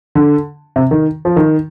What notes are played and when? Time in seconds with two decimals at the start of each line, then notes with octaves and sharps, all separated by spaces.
0.15 D3
0.76 C3
0.91 D#3
1.25 F3
1.36 D#3